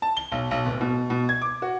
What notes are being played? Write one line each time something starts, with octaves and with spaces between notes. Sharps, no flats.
A5
G7
B1
B1
D1
B2
B2
G#6
D6
F#4